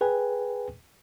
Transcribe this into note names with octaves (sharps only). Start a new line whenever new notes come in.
G#4 B4 G5 G#5